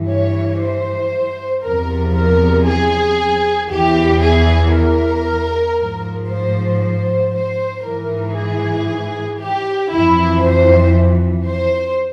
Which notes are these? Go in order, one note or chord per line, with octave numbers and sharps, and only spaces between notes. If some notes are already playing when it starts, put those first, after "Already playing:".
Already playing: G2 E3
C#5
C5
E2 C3 F3 A#4
A#4
G#4
E2 E3 G4
G#4
A#4
G#2 F3
C5
C5
C5
G#2 E3 A#4
G#4
G4
F2 E3 E4
C5
C5